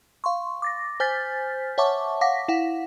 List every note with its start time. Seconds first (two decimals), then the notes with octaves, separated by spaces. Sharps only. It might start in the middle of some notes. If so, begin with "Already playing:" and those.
0.24 F5 C6 C#6
0.62 D6 A6 A#6
1.00 C5 G#5 F6 G6 A6 B6
1.78 C#5 E5 F#5 A5 C#6 D6
2.21 F5 F#5 D6 A#6 B6
2.48 E4 F5 F#5